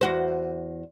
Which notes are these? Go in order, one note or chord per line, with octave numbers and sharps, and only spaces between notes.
E2 F#4 C5